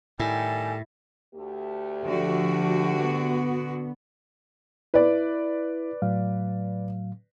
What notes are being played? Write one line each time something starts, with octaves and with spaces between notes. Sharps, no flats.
A2 D#3 G3 E4 A4 G#5
D2 A3 G4
D3 F3 F#4
B3
E4 B4 D5
A2 F#3 F5